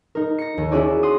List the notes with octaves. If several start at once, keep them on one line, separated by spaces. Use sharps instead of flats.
D#4 A#4
A#6 C#7
D#2
C#4 E4 F#4 G#4 C#5 D5
F#5 C6 D#6